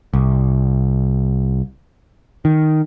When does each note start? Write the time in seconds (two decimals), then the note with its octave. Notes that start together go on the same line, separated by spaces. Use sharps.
0.14 C2
2.45 D#3